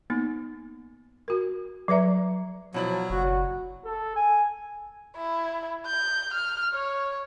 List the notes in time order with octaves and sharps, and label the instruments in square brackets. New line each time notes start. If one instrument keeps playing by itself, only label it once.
[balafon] A#3 B3 D#4
F#4 A#4
F#3 B4 D5 E5 A#5
[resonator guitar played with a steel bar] B2 E4 D5 [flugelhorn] F3 [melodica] F#3
[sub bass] F#1 [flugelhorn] F#4
[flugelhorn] A4
G#5
[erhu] E4
G6
F6
C#5